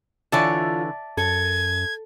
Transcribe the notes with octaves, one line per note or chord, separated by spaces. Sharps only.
D3 E3 F4 C#5 D5 E5 A5
F#2 A4 G#6